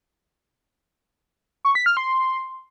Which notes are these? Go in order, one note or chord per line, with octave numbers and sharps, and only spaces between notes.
C#6
B6
F6
C6